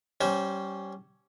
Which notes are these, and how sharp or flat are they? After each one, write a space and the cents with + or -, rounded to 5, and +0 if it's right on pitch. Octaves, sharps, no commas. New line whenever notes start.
G3 -20 C#4 +0 C5 -5